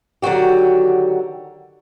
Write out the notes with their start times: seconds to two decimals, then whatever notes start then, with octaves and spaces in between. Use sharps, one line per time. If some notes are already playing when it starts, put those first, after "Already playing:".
0.22 D3 D#3 F#3 F#4 G4